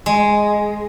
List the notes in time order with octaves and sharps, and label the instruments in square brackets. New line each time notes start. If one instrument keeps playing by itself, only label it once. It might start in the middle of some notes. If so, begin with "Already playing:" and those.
[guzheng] G#3